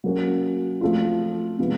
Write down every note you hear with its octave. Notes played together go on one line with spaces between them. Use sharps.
F#3 A#3 C#4 F#4
F3 A3 C4 F4
C3 F3 G#3 B3